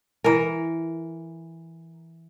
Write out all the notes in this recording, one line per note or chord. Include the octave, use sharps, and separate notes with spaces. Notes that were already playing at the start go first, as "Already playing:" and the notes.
E3 A#4